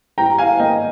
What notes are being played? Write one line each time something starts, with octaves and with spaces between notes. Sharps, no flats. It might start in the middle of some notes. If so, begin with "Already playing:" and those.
G3 G5 A#5
F5 G#5
F5
A#3 D#5 G5